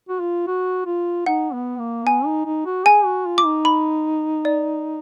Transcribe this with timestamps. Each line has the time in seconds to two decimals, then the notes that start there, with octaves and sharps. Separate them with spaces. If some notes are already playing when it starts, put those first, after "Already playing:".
0.09 F#4
0.20 F4
0.47 F#4
0.86 F4
1.26 D#4 F#5
1.53 B3
1.79 A#3
2.06 B3 G#5
2.26 D#4
2.46 D#4
2.66 F#4
2.86 G#4 G#5
3.05 F#4
3.26 F4
3.38 D6
3.45 D#4
3.65 B5
4.45 D5